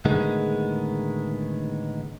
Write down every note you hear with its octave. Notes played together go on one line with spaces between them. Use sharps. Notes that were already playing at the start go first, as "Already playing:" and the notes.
A2 D3 D#3 G#3 B3